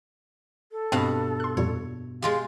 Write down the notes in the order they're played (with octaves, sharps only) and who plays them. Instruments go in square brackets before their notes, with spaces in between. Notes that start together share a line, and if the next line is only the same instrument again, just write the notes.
[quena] A4
[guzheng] G2 B2 F5 [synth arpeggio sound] C4
[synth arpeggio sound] C6 F#6
[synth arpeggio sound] F2 A#2 G3 [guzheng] C#5
[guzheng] G#3 F4 G4 [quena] F5